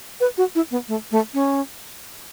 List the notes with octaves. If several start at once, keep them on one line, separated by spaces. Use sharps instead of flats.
B4
F#4
E4
B3
A3
A3
C#4